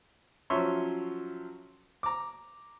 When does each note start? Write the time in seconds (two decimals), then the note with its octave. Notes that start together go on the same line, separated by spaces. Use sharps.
0.50 F3 F#3 C#4 C#5 E5 C6
2.03 A#5 D6